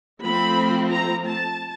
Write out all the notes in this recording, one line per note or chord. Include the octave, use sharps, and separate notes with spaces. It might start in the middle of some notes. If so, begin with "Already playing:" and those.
F3 A3 C4 B5
A#5
A5